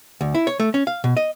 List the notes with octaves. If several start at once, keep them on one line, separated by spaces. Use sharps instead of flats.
D2
E4
C#5
A3
C#4
F5
B2
D#5